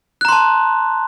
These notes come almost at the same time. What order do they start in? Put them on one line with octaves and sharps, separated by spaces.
F#6 A#5 C6 A5